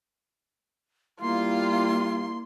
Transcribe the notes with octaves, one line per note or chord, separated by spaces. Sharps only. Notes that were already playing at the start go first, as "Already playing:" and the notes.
G3 A#3 E4 F4 C6